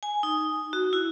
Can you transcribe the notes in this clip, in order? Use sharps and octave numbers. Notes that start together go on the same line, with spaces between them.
G#5
D#4
F#4
E4